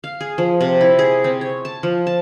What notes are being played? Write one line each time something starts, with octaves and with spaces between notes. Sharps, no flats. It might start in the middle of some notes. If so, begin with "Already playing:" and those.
F5
G#4
F3
C3
E4
G#4
C4
C#5
A5
F3
A5